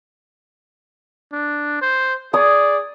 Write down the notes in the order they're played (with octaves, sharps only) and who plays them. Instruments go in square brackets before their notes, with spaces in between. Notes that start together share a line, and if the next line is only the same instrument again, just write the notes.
[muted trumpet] D4
C5
[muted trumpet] G#4 [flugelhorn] D5 [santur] D#6